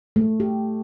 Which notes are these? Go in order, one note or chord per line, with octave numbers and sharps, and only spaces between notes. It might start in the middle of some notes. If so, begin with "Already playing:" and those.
A3
G4